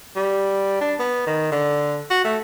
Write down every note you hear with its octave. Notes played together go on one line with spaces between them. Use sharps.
G3
D4
B3
D#3
D3
F#4
A3